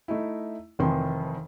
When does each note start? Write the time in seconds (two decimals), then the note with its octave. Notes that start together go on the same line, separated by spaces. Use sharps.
0.08 A3 D#4 E4
0.79 F1 F2 D#3 E3 C6